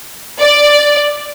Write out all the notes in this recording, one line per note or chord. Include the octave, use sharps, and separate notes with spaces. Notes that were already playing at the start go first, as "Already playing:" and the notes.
D5